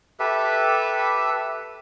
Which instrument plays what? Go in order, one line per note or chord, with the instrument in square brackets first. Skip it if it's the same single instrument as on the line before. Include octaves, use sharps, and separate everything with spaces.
[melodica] G4 A4 B4 E5